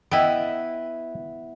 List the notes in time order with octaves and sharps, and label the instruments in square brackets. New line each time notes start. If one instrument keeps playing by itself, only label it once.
[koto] B3 E4 [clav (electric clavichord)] D#5 G5